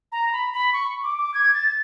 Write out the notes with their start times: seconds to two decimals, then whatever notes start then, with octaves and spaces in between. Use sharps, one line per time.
0.12 A#5
0.32 B5
0.54 B5
0.73 C#6
1.03 D6
1.18 D6
1.34 G#6
1.54 A6